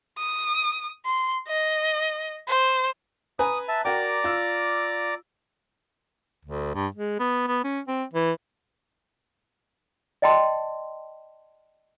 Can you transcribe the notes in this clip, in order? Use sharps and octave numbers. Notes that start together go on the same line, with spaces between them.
D#6
C6
D#5
C5
B4 G#5 A#5 D#6
E5 A5
F#4 A#4 D5 G5 A#5 D6
F4 E6
D2
G2
G#3
B3
B3
C#4
C4
E3
D5 D#5 G5 A5 C6